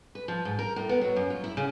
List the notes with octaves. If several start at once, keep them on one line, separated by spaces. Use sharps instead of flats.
B4
F3
G#2
A#4
A2
B3
F#3
F#2
F4
E4
C#3